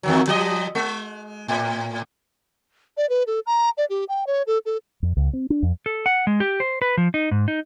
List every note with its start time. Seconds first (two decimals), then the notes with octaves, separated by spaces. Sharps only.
0.03 E2 D#3 F#3
0.27 F3 G3 D#5
0.75 G#3
1.48 A2
2.97 D5
3.09 B4
3.27 A4
3.46 A#5
3.78 D5
3.90 G4
4.09 G5
4.27 C#5
4.47 A4
4.66 A4
5.03 F2
5.17 C#2
5.33 C4
5.50 D4
5.63 F2
5.86 A4
6.06 F#5
6.27 G#3
6.40 G4
6.60 C5
6.82 B4
6.97 F3
7.14 D#4
7.31 G#2
7.48 D#4